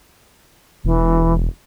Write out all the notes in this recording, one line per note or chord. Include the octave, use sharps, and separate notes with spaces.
E1 E3